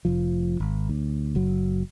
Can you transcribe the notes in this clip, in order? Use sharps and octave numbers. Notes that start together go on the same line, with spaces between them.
F1 F3
G#1
D2
F#1 F#3